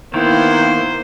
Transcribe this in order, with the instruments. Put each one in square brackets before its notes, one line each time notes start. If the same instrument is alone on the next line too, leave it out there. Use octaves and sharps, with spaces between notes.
[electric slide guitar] D#3 [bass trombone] A#3 [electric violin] B3 E4 [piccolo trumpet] C5